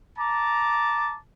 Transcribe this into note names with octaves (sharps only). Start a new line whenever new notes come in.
A5 A#5 D6